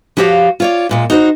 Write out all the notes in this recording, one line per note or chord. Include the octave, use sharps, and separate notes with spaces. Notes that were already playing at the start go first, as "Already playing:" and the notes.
F3 E4 F#4 G4 C#5 F5
F4 C#5 D5
F#2 A#2 G#3
D#4 F#4 A4 C5